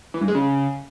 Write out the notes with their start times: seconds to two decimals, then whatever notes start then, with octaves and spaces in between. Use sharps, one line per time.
0.14 E3
0.21 G2
0.28 G#3
0.35 C#3